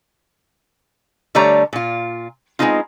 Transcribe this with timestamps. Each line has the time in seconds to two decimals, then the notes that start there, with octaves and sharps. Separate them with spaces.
1.35 D3 G3 A3 C#5 D5 A#5
1.73 A#2 F4
2.59 G#3 A3 B3 C4 D#4 F4